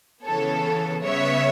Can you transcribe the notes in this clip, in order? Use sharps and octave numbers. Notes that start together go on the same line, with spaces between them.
C#3 E3 B3 A4 C#5
C#3 G3 B3 C#5 E5